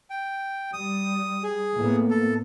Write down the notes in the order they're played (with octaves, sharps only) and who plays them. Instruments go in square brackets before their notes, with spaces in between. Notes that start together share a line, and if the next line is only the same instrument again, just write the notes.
[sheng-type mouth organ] G5
[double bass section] G3 [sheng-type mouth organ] D#6
[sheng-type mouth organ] G#4
[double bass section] A2 A#3 B3
[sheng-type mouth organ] A4